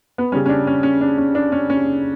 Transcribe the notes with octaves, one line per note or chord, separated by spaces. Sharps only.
B3
C#3 G3 C#4
C#4
D4
C#4
C#4
D4
C#4
D4
C#4
C#4